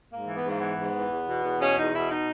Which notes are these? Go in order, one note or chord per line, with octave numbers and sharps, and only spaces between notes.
G#2 A#3
E3
B3
G#2 A#3
E3 B3
G#2
E3
E2
B2
E2
B2 C#4
E2 D#4
B2 E4
D#4